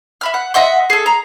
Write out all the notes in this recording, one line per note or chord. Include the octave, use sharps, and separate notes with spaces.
E5 B5 F6
F#5
D#5 E5 F#5 C6
G#4 A4
A#5